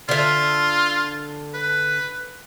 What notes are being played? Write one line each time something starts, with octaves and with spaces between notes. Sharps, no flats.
D3 F4 E5
B4